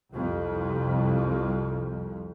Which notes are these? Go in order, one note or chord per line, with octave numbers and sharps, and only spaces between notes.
C2 F2